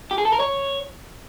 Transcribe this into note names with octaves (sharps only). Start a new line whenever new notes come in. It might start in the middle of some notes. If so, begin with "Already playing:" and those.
G4
G#4
A4
A#4
C#5